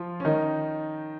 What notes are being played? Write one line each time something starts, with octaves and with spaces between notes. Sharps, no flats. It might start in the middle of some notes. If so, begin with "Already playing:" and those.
Already playing: F3 F4
C#4
D#3 D#4